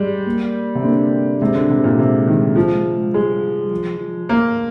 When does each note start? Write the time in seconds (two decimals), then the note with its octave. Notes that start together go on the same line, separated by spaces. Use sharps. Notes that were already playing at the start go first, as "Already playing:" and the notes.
Already playing: G3 G#3
0.26 A#3
0.75 C3
0.83 D3 A#3
1.41 C3 G#3
1.55 D3
1.70 C3
1.84 A#2
1.99 C3 G#3
2.27 D#3
2.56 F3
3.13 G3 G#3
3.71 F3
4.00 F3
4.29 A#3